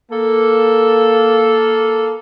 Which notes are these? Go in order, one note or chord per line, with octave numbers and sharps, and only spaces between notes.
A#3 A4